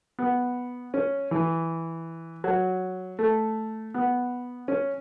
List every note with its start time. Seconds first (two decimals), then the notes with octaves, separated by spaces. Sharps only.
0.19 B3
0.94 C#4
1.31 E3
2.44 F#3
3.19 A3
3.94 B3
4.68 C#4